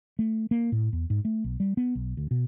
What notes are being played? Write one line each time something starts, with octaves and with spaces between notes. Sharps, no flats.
A3
A#3
A2
E2
G#2
A3
B1
G3
B3
B1
D2
B2